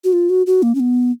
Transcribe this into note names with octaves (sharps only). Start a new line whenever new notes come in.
F#4
F4
F#4
F#4
A#3
C#4
B3